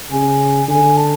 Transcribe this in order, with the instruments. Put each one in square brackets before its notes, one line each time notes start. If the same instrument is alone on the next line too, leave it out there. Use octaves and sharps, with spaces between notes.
[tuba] C#3 [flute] G#5
[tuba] D3 [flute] G#5
[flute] A5